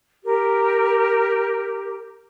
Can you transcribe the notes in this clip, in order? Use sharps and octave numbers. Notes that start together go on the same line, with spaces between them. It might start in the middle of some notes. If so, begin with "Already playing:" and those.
G4 A#4